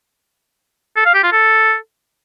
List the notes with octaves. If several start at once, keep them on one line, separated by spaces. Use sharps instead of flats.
A4
F5
G4
F4
A4